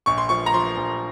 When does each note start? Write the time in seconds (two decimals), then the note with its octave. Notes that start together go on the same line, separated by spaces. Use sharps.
0.06 A#1 C#6
0.18 C6
0.29 F3 C#6
0.46 A#5
0.54 F3 C6
0.77 A#1